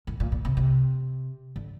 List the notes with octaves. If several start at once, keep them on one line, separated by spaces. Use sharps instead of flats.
A2
A#2
A#2
C3
C3
D3